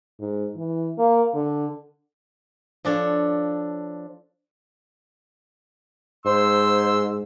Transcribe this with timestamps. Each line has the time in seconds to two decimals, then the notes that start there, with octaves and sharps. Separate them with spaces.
0.20 G#2
0.56 E3
0.98 A#3
1.34 D3
2.85 F3 D4 A4 C#5
6.26 G#2 C5 C6 E6